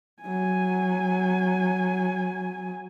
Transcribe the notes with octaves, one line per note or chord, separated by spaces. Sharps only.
F#3 G#5